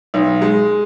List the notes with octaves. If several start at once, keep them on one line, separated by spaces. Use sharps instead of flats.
B1
G#3